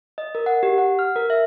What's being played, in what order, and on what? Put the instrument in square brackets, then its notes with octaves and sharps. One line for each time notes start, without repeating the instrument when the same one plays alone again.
[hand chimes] D#5
A#4
F#5
G4
F#5
F6
A#4
E5